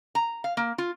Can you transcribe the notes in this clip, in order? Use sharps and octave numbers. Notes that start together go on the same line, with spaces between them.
A#5
F5
A#3
F4